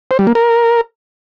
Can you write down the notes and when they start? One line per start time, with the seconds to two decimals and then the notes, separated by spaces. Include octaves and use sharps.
0.11 C5
0.19 G3
0.27 A#3
0.35 A#4